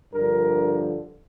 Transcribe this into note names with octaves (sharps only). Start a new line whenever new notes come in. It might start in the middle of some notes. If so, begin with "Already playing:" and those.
G2 D3 F3 A#4